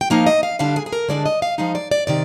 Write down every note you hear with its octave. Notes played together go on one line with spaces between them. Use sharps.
G5
F3 A#3 D#4 F5
D#5
F5
D3 G3 D4 F5
G#4
G#4
A#4
D3 G#3 D4 D5
D#5
F5
F3 G#3 D#4 F5
D5
D5
C3 D#3 D5